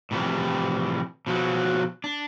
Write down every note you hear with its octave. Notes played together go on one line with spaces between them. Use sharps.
A2 C3 E3 F3 G3
B2 F3 F#3
D4